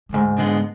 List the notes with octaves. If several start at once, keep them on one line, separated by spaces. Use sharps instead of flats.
F#2
D2 G#2
D3 G#3 B3